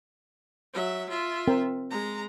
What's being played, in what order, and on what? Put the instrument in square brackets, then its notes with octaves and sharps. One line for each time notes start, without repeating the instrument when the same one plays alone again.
[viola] F#3 E5
F4 E5
[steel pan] C4 A#4 G5
[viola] G#3 A#5